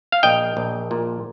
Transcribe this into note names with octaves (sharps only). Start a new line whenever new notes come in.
F5
A#1 D#5 G5
A#1
A#2